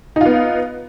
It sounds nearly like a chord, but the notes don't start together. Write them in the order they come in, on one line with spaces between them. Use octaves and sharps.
D#4 F4 B3